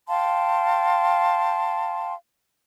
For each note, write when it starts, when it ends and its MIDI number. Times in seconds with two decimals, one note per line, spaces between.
0.08 2.13 77
0.08 2.13 79
0.08 2.13 81
0.08 2.13 84